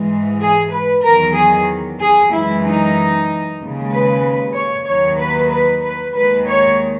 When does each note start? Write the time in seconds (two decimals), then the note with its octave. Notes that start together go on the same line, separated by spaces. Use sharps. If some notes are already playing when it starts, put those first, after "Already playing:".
Already playing: G#2 E3 G#3
0.40 G#4
0.72 B4
1.04 E2 D#3 F#3 A#4
1.36 G#4
2.00 G#4
2.32 F#2 E3 G#3 E4
2.63 D#4
3.59 D#2 C#3 G#3
3.92 B4
4.56 C#5
4.88 D#2 D#3 F#3 C#5
5.20 B4
5.51 B4
5.83 B4
6.15 D#2 D#3 G#3 B4
6.48 C#5